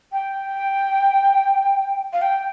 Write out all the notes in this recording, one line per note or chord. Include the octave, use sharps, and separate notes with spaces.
G5
F5
G5